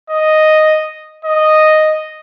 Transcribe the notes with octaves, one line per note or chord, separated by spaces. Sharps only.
D#5
D#5